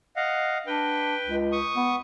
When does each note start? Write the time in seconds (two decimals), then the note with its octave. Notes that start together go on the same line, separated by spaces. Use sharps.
0.16 D#5 F5 F#5
0.67 D4 B4 G5
1.26 C#2
1.52 C#6 D#6
1.76 B3